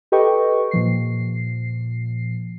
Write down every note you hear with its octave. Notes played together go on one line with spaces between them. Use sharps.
G4 A4 B4 D#5 G5 C#6
A#2 F3 C7